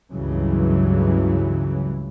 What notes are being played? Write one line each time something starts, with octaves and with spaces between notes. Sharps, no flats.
C#2 G2 C#3 E3 F#3